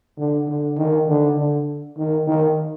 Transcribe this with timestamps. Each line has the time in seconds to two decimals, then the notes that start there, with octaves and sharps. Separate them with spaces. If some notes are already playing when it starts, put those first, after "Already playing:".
0.18 D3
0.48 D3
0.77 D#3
1.08 D3
1.38 D3
1.98 D#3
2.27 D#3